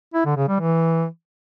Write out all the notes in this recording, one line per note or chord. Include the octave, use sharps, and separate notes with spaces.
E4
D3
C#3
G3
E3